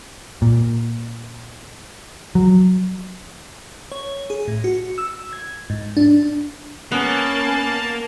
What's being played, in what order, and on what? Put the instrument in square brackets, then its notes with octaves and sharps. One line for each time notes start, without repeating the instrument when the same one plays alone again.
[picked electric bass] A#2
F#3
[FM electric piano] C#5
G#4
A2
F#4
E6
G#6
G#2
D4
[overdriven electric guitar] A#3 [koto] B3 [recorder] C#4 [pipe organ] A5